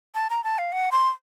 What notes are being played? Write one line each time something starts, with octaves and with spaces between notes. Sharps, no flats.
A5
A#5
A5
F5
F#5
C6